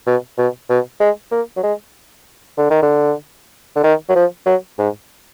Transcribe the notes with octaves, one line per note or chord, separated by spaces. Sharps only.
B2
B2
B2
G#3
A#3
F#3
G#3
D3
D#3
D3
D3
D#3
F#3
F3
F#3
G#2